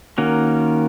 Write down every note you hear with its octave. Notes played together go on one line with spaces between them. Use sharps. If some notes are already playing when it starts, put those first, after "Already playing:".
D#3 A#3 C#4 F#4